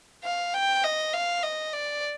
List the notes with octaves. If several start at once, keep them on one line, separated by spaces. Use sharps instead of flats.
F5
G5
D#5
F5
D#5
D5